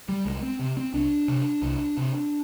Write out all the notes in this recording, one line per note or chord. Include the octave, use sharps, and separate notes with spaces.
G3
C2 G#3
C4
C3
C4
C2 D4
C3
C2
C3